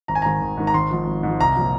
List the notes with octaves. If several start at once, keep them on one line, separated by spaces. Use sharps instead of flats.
G#1 A#5
G#5
G#2 D#3 A#5
G#1
G#2 D#3
A#5
G#1 C6
G#2 F3
G#1
G#2 F3
C2 A#5
A#2 F3